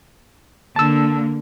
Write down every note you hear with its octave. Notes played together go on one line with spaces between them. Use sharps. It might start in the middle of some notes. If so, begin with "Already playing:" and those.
D3 A#3 A5 E6